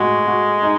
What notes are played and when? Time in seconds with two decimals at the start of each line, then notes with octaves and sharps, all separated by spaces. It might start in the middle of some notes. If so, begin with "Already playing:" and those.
Already playing: A2 G#3 F#4
0.26 F#4
0.62 D#4